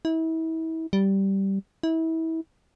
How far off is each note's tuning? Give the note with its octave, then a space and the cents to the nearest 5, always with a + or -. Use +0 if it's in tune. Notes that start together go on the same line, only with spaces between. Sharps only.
E4 -35
G3 -10
E4 -30